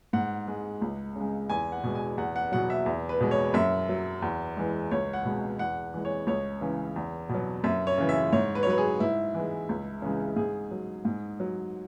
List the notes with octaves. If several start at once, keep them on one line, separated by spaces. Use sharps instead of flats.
G#2 F#5
G#3
C#2
C#3 G#3
E2 G#5
F#5
B2 G#3
G#5
E2 F#5
F#5
B2 F#3 F#5
E5
E2
B4
B2 G#3
C#5
F#2 E5
F#3
E2
E3 G#3
C#2 C#5
F#5
B2 G#3
E2 F#5
E3 G#3
C#5
C#2 C#5
C#3 E3
E2
B2
F#3
F#2 E5
C#5
C#3 E3
E5
G#2 C#5
B4
C#5
F#3 B4
G#4
G#2 E4
E3 G#3
C#2
C#3 E3 G#3
G#2 G#4
F#3
G#2
F#3